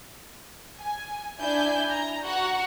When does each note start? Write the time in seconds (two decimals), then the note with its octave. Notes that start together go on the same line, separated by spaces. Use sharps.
0.78 G#5
1.40 D4 E4 G#5 G6
1.89 A#5
2.24 F#4 F#5 A#5